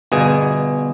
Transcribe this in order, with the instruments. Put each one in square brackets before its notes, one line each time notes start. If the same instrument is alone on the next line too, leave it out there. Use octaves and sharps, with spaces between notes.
[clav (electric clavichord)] G1 B2 G#4 G#5